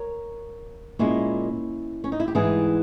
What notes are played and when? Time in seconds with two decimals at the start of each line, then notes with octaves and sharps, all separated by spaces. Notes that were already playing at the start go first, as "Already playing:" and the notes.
Already playing: A#4 C#5
0.99 A#2 G#3 C#4 E4
2.04 C#4
2.12 D#4
2.20 E4
2.28 G4
2.35 G#2 E3 G3 E4 G#4